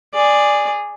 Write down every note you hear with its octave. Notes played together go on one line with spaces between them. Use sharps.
G#4 D5